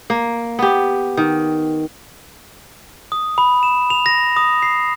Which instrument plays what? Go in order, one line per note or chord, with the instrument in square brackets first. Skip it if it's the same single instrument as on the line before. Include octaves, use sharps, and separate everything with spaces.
[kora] A#3
B3 G4
D#3
[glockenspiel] D#6
B5
E7
F7
A#6
D#6
C7